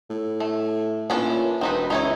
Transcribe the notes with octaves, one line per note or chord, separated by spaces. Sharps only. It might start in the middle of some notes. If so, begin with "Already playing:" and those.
A2
A3
A#2 E3 C#4 D4
E1 C4 D#4 B4
C#2 D#4 E4 C#5